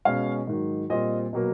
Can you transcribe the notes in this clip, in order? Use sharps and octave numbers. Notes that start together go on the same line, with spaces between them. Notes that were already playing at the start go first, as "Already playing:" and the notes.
B2 G#3 C#4 F5
G#2 D#3 F#3
A#2 G3 C4 F4 D#5
B2 F#3 A#3